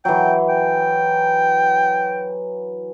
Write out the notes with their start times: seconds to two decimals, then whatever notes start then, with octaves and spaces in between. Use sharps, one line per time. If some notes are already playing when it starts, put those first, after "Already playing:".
0.05 E3 F#3 G5
0.49 G5